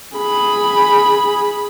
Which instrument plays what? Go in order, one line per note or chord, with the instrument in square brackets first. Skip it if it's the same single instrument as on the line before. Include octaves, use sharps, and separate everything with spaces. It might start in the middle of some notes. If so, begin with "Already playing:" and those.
[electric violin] G#4 B5